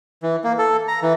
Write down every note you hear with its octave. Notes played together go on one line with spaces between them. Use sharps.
E3
A#3
A4
A#5
E3